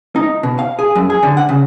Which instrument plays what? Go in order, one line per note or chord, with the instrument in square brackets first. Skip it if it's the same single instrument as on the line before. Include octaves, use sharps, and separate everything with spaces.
[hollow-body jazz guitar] D#4
B2
F5
G#4
F#2
G#4
D3
F#5
C#3